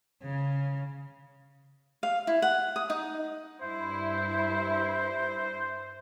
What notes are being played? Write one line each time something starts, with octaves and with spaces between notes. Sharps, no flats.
C#3
F5
E4
F#5
D#6
D#4
G2 E4 C5